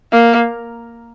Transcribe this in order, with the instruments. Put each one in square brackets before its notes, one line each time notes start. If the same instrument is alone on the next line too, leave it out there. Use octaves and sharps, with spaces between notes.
[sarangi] A#3